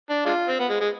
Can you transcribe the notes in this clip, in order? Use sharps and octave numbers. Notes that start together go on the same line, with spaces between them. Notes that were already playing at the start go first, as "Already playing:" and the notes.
D4
G#3 D4 F4
C4
B3
G#3
G#3